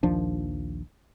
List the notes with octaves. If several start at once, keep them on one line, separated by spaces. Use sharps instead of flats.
A#1 D#2 F3 D4